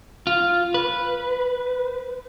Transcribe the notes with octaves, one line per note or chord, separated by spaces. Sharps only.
F4
B4